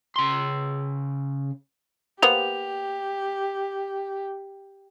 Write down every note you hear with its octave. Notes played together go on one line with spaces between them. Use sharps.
C#3 C6
A#3 B3 G4 C5 F7